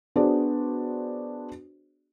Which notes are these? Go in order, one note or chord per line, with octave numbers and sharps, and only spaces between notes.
B3 D4 F#4 G#4 C5 D5